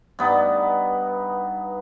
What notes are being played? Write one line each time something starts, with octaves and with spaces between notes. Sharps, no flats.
G2 B3 D#4